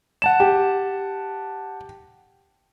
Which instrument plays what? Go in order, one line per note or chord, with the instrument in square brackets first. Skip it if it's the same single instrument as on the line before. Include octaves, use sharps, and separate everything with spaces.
[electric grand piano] F#5 A5 E7
[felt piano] G4